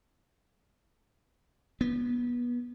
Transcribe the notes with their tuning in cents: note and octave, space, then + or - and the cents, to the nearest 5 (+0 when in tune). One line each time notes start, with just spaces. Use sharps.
B3 -25